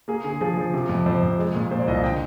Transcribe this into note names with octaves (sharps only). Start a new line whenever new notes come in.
A#3 G#4
D3 G#4
F3 G#4
F3
C3
F2
F2 C5
F2
G#3
A#2
A#2 C5
D5
C2 D#5
F5
D3 G5